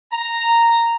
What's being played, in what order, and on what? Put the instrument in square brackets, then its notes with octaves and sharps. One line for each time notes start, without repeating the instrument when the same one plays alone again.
[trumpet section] A#5